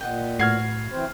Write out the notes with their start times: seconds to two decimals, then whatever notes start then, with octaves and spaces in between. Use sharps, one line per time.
0.01 A#2 D#5 F#5 G5
0.39 A2 F#4 B4 F6 G#6 C7
0.92 E3 C4 C5